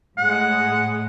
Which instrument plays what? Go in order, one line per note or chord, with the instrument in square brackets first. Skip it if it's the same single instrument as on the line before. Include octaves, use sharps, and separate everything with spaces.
[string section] A2 G#3 [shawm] F#5